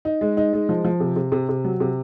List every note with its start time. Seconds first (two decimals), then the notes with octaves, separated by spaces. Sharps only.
0.05 D#4
0.21 G#3
0.37 D#4
0.53 G#3
0.69 F3
0.85 F3
1.00 C3
1.16 C3
1.32 C3
1.49 C3
1.64 F#3
1.80 C3